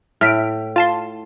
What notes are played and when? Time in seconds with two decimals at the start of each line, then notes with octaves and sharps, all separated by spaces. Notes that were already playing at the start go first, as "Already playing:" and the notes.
0.21 A2 F6 B6 D7
0.76 F4 A5 C6